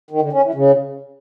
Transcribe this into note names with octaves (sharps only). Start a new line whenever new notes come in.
D#3
D3
C#4
E3
C#3